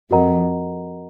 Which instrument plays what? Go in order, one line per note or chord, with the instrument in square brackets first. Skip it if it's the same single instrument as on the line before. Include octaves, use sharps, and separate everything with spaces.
[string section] F2 [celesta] F#4 A#4 D#5 F#5 A#5